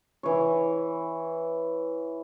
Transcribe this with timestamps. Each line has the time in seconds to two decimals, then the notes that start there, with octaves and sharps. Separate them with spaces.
0.23 E3 C#5